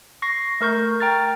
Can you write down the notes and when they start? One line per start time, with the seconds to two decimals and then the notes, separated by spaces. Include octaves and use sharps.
0.22 C#6 A#6 C7
0.61 A3 A#4 C#6 G6
1.00 G5 A#5 F6 A6